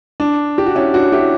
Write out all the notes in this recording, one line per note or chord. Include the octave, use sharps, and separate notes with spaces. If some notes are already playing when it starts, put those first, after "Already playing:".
D4
G4
F#4
C#4 E4
D4 F#4
E4 G4